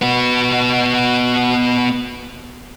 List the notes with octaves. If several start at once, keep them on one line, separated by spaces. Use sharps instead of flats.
B3 F#4